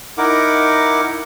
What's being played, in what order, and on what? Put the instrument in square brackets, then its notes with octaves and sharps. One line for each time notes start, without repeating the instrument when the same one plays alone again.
[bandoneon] D#4 E4 A#4 F#5 D6